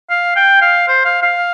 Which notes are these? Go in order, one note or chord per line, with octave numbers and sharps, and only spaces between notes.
F5
G5
F5
C5
F5
F5